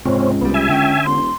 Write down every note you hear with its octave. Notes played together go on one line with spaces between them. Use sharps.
C#2 G#2 C3 C4 C#4
C2 G3 B3
E5 G#5
C#2 D3 C#4 G5
E1 C6